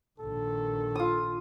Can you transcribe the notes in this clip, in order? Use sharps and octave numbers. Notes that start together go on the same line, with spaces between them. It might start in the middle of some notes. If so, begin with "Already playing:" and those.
A#1 D#3 A4
F4 D#6